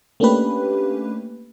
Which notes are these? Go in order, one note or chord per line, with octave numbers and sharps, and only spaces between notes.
A3 A#3 C#4 D4 G4 B4